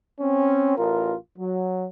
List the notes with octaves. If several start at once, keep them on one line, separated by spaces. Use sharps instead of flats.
C4 C#4
A1 F4 A#4
F#3